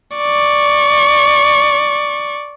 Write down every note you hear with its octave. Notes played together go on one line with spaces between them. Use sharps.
D5 C#6